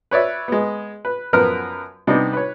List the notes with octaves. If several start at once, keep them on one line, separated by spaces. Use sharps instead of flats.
B4 C#5 D5 E5
G#3 B3
B4
F#2 F3 B3 A#4 B4 F6
C3 G3 B3 D4 D#4
B4 C#5